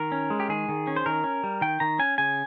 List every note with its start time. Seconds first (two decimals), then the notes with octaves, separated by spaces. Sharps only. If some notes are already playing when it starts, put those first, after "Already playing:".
Already playing: D#3 A#4
0.12 C#4
0.30 G#3
0.40 G4
0.49 D#3 G#4
0.69 D#3
0.87 C#4
0.96 C5
1.06 D#3 A#4
1.24 C#4
1.44 G3
1.61 D#3 G5
1.80 D#3 A#5
1.99 C#4 G#5
2.18 C#3 G#5